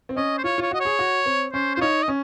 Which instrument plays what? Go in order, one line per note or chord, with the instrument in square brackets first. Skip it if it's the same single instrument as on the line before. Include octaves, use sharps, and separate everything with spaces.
[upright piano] C4
[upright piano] C#4 [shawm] D#5
[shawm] C5
[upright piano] F4 [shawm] C#5
[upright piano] F4 [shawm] C#5
[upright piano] F#4 [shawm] D#5
[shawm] C#5
[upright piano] G#4
F#4
C4
[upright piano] C#4 [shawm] C5
[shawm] C5
[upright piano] F4
[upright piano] D#4 [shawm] C#5
[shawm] D#5
[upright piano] C#4